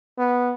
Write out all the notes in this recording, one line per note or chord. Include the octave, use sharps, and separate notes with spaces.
B3